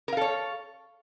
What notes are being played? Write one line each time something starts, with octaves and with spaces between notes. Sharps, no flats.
A4 A#4 C#5 F5